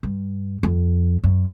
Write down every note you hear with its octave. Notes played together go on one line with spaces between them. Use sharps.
G2
F2
F#2